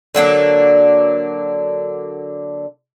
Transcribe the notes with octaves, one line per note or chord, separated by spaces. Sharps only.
D3 F#3 A#3 D4